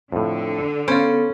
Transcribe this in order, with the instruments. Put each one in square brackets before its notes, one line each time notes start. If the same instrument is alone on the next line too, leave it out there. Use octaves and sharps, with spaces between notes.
[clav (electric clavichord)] F2 A2 [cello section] D3
[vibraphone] B3 A4 [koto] C#4 [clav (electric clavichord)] C5 F5